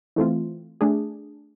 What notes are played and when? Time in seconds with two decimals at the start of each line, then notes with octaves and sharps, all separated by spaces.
0.16 E3 A3 C4 F4
0.81 A3 D4 G#4